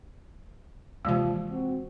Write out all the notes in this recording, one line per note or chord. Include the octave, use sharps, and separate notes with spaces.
D#2 C3 E3 F3 G#3
C4 F#4